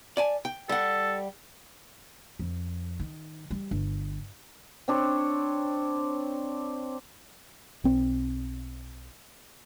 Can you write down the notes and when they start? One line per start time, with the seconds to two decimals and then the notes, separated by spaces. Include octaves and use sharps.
0.17 D5 G#5 A5
0.45 G5
0.69 G3 A4 F#5
2.39 F2
3.00 D#3
3.51 G3
3.71 G1
4.88 C4 D4 C#5
7.84 B1 C4